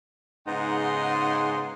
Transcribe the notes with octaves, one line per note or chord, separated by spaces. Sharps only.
G#2 C#3 B3 D#4 F#5 C6